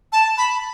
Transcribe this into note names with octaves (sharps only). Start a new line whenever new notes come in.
A5
B5